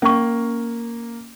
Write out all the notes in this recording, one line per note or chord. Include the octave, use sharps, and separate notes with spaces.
A#3 C#4 C#6